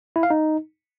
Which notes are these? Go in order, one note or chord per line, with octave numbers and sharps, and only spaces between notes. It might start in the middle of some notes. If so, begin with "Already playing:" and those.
E4
F5
D#4